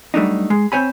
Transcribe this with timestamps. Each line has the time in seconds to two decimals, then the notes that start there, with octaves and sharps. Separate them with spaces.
0.14 F#3 G3 A3 D4 D#4
0.50 G#3
0.72 C4 C5 C#5 G#5 B5